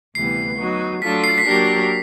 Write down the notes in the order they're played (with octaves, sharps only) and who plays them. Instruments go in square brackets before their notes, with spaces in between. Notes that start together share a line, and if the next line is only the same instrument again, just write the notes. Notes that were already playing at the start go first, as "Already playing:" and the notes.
[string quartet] D2 C3 E3 G3 B3 [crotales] C7
[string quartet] F#3 B3 D#4 F#4
[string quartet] F#3 A3 D4 F4 A4 [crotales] B6
[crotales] C7
B6
[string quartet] F#3 A#3 D4 G4 A#4 [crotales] C7